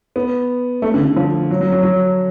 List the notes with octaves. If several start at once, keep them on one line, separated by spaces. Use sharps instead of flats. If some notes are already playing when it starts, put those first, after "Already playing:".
B3
A3
D3
D3
F3
F#3
F#3
F#3
F#3